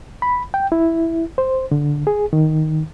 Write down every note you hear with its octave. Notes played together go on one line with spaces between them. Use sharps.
B5
G5
E4
C5
D3
G#4
D#3